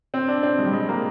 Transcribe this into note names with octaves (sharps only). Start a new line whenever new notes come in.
C4
D4
C4
G#3
G3
G#3
A#3